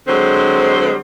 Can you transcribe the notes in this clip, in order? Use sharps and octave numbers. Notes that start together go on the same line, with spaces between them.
D3 F#3 G#3 C4 C5